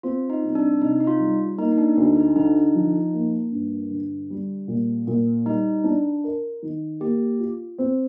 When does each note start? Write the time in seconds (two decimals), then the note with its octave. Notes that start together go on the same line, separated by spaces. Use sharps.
0.03 C4 F4
0.30 D#4
0.43 C2
0.55 D4
0.81 C3 D#4
1.00 D#4
1.07 F4
1.20 G3
1.58 A#3 D#4
1.72 D#4
1.78 D4
1.97 D2 D#4
2.17 D#4
2.35 D3 D#4
2.75 F3
3.13 A#3
3.52 G2
3.91 D3
4.30 G3
4.68 A#2
5.07 A#2
5.45 G3 D#4
5.84 D4
6.24 A#4
6.62 D#3
7.00 A#3 G4
7.39 F4
7.78 C4